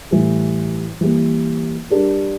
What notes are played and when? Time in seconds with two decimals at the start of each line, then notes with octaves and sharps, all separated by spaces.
0.11 A2 E3 G3
1.01 E3 G3 A#3
1.90 G3 D4 G4 A#4